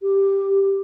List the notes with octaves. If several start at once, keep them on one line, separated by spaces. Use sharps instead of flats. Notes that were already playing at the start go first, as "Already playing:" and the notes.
G4